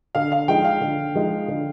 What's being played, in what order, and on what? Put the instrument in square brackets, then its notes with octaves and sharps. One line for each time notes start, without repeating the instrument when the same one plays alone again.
[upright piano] D3 [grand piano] F5
[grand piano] F5
[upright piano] F3 G#3 D#4 [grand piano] G5
[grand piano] F5
[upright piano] D3
F3 G#3 D#4
D3